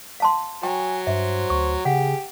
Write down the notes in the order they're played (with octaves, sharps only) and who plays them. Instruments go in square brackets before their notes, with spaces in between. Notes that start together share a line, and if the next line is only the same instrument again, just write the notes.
[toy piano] F5 A5 C6
[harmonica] F#3 [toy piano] G5 [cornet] G#5
[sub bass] G2 [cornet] C5 [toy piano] E5
[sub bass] D2 [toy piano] C#6
[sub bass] C#3 [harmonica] G4 [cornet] G#4 [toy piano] F#5